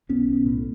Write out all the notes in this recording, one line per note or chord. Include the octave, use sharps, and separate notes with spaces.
B1 B3 C#4
B1
A2